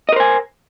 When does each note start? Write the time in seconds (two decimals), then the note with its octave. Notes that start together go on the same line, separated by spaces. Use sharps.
0.09 D#5
0.12 A#4
0.16 C5
0.20 G#5